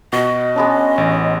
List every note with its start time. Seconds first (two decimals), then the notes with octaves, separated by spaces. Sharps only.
0.13 B2 F#4 D#5 B5
0.56 G#3 B3 C#4 D4
0.98 A1